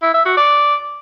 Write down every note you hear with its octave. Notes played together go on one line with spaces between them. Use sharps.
E4
E5
F#4
D5